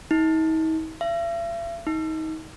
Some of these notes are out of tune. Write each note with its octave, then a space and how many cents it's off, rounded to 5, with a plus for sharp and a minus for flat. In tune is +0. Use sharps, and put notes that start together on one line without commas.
D#4 +45
E5 +45
D#4 +30